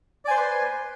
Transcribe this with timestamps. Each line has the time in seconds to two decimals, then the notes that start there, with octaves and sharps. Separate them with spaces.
0.25 D5
0.28 G#5
0.31 C5
0.34 C6
0.37 B4